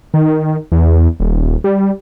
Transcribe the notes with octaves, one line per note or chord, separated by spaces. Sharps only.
D#3
E2
D#1
G3